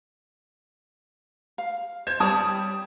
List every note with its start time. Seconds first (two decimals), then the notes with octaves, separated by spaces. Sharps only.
1.58 F5
2.07 C5 G#6
2.20 G3 C#5 D5 A5 D#6